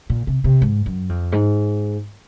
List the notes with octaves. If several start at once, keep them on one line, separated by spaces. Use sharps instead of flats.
A#2
C3
C3
G#2
F#2
F2
G#2